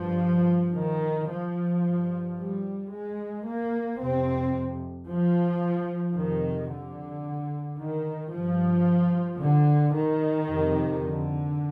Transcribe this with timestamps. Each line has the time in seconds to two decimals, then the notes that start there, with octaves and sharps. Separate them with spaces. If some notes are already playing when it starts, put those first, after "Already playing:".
Already playing: G2 F3
0.75 D#3
1.30 F3
1.83 G2
2.38 G3
2.91 G#3
3.45 A#3
3.99 F2 C3 C4
5.07 F3
6.15 F2 C3 D#3
6.69 D3
7.77 D#3
8.31 G2 F3
9.38 D3
9.94 D#3
10.47 F2 C3
11.01 D3